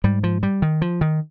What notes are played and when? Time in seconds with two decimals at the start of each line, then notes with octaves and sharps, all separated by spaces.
0.04 G#2 G3
0.23 F3
0.43 G3
0.62 D#3
0.82 F3
1.01 D#3